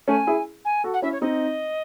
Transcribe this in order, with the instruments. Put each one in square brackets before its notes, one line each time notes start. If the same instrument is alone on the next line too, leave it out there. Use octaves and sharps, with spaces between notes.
[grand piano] A3 C#4 [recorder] G#5
[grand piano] E4 G#4
[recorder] G#5
[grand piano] F#4 A4
[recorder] F#5
[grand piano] C#4 E4 [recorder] E5
[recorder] C#5
[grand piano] C4 D#4 [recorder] D#5